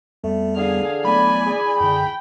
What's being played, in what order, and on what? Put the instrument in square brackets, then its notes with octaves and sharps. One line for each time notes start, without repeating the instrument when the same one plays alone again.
[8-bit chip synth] F2 G3 B3 [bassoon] A3
[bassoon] D3 [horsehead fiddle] G#4 F5
[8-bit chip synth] F#3 A3 B3 [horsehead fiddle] D5 G#5 [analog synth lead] B5
[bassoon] G#4
[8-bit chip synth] F#2 D3 [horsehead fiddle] G5